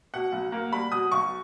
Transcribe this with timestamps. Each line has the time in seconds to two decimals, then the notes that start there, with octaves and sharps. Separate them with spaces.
0.14 B2 F#5
0.32 B1
0.52 A#3
0.72 G3 B5
0.92 B2 D#6
1.12 B1 C#6